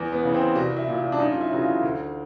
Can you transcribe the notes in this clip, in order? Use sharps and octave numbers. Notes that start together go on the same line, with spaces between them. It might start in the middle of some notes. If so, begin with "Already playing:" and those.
Already playing: E2
B3
C#3 E3
C4
C2 F#4
E4
A#2
E4
D4
F#2 D#4
F4
E4
C#3 E3 F#4
F4
D2